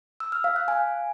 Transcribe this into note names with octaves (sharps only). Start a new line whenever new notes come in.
E6
F6
F5
F#6
G#5